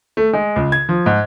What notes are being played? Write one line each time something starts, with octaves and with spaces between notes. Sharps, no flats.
A3
G#3
C#2
G#6
F3
G#2